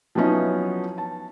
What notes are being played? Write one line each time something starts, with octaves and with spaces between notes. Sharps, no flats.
F3 F#3 B3 C#4 D#4 E4
A5